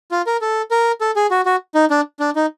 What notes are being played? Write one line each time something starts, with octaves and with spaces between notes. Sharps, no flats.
F4
A#4
A4
A#4
A4
G#4
F#4
F#4
D#4
D4
D4
D#4